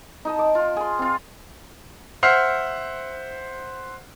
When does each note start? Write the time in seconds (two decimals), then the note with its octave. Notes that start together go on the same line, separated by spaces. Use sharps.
0.25 D#4 D#5 A5
0.39 D6
0.55 F4
0.77 G#4 C6
0.99 C4 F4
2.23 C5 E5 F#5 F6 C7